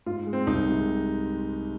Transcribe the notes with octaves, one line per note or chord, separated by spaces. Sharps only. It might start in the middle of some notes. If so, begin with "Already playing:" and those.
G#2 F4
G#3
C4
C2 D#4
C3 G#3